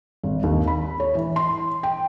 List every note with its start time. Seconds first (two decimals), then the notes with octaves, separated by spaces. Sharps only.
0.24 G#1
0.43 D#2
0.67 B5
1.00 C#5
1.15 E3
1.36 C6
1.83 G5